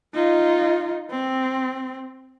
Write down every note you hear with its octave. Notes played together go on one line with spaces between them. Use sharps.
D#4 F4
C4